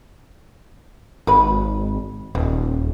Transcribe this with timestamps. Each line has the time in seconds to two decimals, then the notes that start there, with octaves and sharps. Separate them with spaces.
1.27 G#1 F#4 B4 B5
2.35 D#1 D#3